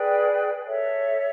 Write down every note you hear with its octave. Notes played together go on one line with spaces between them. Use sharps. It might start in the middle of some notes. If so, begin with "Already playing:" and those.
Already playing: G#4 B4 D5 G5
A4 C#5 E5